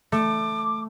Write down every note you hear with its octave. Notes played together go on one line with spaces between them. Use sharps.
A3 D6